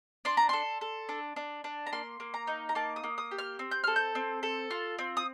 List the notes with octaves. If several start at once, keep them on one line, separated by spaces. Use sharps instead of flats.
D4 C6
A#5
A4 C6
A4
D4
D4
D4
A#5
A#3 C6
A#3
A#5
D#4
A#5
A#3 A5
D#6
A#3
D#6
G4
F6
C4
G6
A4 F6
G6
C4
A4
F4
C4
D#6